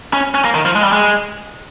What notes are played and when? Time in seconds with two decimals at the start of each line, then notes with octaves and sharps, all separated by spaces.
0.13 C#4
0.34 C#4
0.45 A#3
0.55 D#3
0.65 F3
0.75 G#3
0.83 G3
0.92 G#3